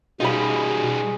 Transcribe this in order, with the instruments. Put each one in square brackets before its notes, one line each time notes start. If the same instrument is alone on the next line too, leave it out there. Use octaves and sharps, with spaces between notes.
[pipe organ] B2 [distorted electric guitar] G3 D#4 [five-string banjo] F4 G4 B5 [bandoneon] G#4